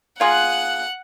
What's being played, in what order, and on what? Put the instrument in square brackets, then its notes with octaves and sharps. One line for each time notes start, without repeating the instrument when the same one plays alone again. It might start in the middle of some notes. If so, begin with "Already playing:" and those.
[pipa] A#3 F4 G#4 [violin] F#5 F#6